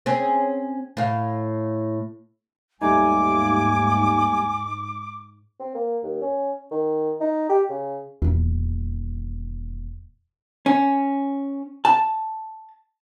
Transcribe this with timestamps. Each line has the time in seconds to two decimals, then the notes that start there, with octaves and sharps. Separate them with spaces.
0.06 C4 C#4 G#4
0.97 A2 F5
2.82 D#2 G#2 G3 A3 D#4 G#5 D6
5.60 C4
5.74 A#3
6.03 D#2
6.21 C#4
6.71 D#3
7.20 D#4
7.49 G4
7.69 C#3
8.22 D#1 E2 F4
10.66 C#4
11.85 A5